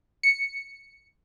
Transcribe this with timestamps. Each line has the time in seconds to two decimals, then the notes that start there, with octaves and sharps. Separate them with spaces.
0.23 C#7